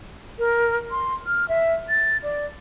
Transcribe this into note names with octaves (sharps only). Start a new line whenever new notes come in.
A#4
C6
F6
E5
A6
D5